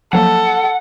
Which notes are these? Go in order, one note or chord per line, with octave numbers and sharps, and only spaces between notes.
F3 F#3 A#3 A4 F#5